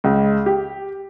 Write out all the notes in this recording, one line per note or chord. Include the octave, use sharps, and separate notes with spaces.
C#2
G4